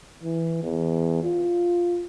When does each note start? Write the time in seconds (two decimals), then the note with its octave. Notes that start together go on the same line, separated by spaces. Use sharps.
0.23 E3
0.63 E2
1.23 F4